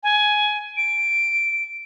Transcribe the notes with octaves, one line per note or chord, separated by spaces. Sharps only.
G#5
D7